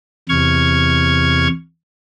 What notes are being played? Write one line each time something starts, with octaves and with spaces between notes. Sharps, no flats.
E2 C3 C#6 F6 G#6